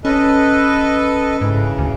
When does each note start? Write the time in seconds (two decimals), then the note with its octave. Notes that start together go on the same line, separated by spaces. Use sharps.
0.05 C#4 A4 B4 D#5
1.42 G#2 C#3 E3
1.78 D2